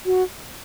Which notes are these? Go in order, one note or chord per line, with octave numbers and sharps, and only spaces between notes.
F#4